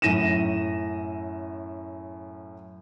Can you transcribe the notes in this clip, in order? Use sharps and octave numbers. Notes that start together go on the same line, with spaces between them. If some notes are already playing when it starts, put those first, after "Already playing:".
F#2 A2 A#6 D#7 E7